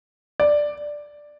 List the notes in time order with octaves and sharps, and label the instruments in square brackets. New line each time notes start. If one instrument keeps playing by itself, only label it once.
[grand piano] D5